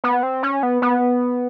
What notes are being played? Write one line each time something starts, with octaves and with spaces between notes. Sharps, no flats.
B3
C4
C#4
B3
B3